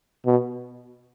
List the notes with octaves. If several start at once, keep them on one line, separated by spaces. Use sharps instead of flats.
B2